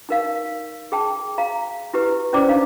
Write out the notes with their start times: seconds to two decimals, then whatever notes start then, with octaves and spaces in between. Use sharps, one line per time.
0.09 D#4 A#4 F5
0.92 G#4 G5 A5
1.38 F5 A#5
1.94 E4 G4 B4
2.33 C#4 E4 C5 D5 A#5 D6
2.47 D4 D#4 F5